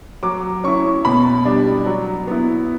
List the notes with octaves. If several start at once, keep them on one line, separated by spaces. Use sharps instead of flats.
F#3 D6
C#4 E4 C#6
B2 B5
G3 D4
F#3
B3 E4